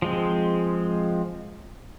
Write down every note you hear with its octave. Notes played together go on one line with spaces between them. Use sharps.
F3 G#3 C4